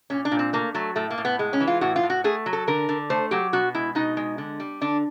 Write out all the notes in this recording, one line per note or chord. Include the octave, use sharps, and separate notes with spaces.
A#2 C#4
D4
A#2
C4
A3 A#3
F#3 A3
A2 A3
A#3
A2
B3
G#3
C#4
E3
F4
A2 F#4
F4
A2
F#4
A3 G#4
F#3
A4
D3 A#4
D3
A3 C5
F#3 G4
B2 F#4
G#3 E4
B2 D#4
G#3
D3
G3
D3 D4